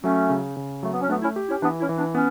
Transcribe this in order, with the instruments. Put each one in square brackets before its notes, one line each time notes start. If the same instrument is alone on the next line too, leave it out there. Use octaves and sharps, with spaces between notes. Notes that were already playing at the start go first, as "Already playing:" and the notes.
[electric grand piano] F#3 [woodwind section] A3 C#4
[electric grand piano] C#3
C#3
[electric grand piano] F#3 [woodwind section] A3
[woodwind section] B3
C#4
[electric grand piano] A3 [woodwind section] B3 D4
[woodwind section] C#4 E4
[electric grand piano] G4
[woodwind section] C#4 E4
[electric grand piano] E3 [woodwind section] B3 D4
[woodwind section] C#4 E4
[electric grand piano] E3
[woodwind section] B3 D4
[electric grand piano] B3 [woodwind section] C#4